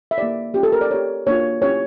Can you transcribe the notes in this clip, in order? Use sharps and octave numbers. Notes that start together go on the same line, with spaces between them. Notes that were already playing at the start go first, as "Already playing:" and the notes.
E5
A#3 E4 G4 D5
C#4 F4 G4
A4
A#4
D5
C#4 G4 C#5
A#3 D4 F4 C#5
C#4 E4 G4 C#5